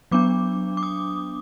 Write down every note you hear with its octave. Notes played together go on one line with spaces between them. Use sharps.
F#3 B3 D4 D6
D6
D#6